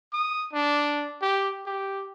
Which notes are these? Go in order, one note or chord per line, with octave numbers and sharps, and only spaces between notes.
D#6
D4
G4
G4